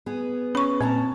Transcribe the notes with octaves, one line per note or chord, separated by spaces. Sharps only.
B3 G#4
C#4 B5 C#6
A#2 C4 C#4 A5 A#5